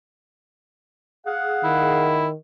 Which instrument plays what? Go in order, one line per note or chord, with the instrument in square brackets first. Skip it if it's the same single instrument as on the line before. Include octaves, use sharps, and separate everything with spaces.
[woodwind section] G#4 F5 F#5
[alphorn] D#3 [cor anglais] E4